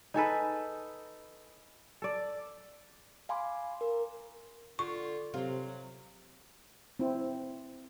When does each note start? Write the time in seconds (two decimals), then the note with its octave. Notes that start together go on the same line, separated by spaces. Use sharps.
0.14 D#4 G#4 A4 B4
2.02 A4 D5
3.29 F5 G#5 B5 C6 D6
3.81 A#4
4.79 D3 F4 C#6
5.34 C3 F#3 C4 F4
6.99 C4 E4